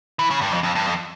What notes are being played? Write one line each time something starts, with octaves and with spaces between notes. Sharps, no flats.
E3
C#3
G2
F2
F2
G2
F2